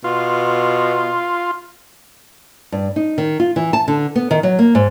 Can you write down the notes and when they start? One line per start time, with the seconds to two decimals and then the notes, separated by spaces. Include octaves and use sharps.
0.04 B2 F4
2.72 G2
2.96 D#4
3.18 D#3
3.40 F4
3.56 E3
3.73 A5
3.88 D3
4.16 B3
4.31 D#3
4.43 F#3
4.59 A#3
4.75 G#2